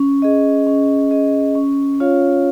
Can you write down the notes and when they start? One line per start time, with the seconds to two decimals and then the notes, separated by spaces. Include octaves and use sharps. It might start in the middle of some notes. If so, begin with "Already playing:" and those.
Already playing: C#4
0.22 G#4 D#5
0.67 C#4
1.11 G#4 D#5
1.55 C#4
2.00 F4 C#5 F5